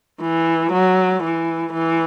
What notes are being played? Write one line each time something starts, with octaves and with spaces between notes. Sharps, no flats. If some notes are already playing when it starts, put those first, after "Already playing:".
E3
F#3
E3
E3